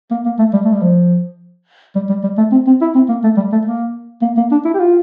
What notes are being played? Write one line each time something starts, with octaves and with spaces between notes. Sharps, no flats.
A#3
A#3
A3
G3
A3
G3
F3
G3
G3
G3
A3
C4
C4
E4
C4
A#3
A3
G3
A3
A#3
A#3
A#3
D4
E4
G4
F4